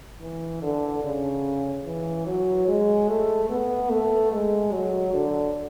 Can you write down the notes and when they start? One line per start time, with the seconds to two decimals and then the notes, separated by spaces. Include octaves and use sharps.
0.21 E3
0.62 D3
1.04 C#3
1.85 E3
2.27 F#3
2.68 G#3
3.09 A3
3.50 B3
3.90 A3
4.32 G#3
4.73 F#3
5.14 D3